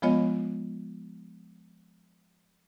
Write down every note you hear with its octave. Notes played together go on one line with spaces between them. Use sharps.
F3 G#3 B3 F4 C#5 D#5